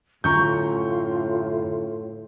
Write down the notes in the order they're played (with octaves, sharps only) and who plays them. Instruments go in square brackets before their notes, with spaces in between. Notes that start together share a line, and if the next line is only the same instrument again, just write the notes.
[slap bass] F#2 D3 C#4 [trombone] A2 [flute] F4 [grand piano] A#5 C#6 G6